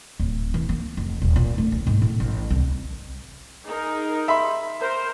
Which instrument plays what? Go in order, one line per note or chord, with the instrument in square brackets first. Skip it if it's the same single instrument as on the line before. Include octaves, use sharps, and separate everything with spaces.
[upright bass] D1
E3
A#3
F1
D#1
A#2
A3
D2
G#2
A2
A1
C2
[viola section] D#4 G#4 A#4
[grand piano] E5 B5 C6
[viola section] A#4 C5